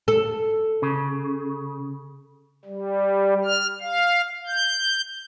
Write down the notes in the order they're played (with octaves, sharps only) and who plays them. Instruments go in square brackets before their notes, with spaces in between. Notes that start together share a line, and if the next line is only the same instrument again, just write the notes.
[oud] A4
[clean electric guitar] C#3
[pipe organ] G3
F6
F5
G6